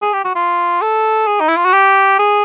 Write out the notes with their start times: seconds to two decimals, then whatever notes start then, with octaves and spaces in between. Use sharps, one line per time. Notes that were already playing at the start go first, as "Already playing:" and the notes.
0.02 G#4
0.13 G4
0.25 F#4
0.36 F4
0.82 A4
1.27 G#4
1.40 D#4
1.48 E4
1.57 F4
1.65 F#4
1.73 G4
2.19 G#4